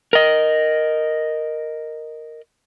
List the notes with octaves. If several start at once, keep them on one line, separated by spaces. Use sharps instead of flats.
A#4 D#5